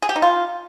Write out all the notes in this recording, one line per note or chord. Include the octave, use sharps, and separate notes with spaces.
G#4
G4
D#4
F4